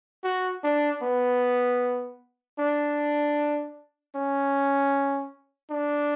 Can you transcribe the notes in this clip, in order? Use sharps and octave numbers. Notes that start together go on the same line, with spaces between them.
F#4
D4
B3
D4
C#4
D4